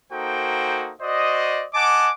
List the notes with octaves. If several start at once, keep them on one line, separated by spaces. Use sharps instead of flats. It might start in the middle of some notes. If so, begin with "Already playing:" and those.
A#3 D#4 F#4 A4 C5 G5
F#4 C5 D5 D#5
D#5 F#5 G#5 A5 D6